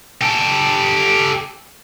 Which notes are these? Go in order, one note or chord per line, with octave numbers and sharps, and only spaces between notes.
G4 A4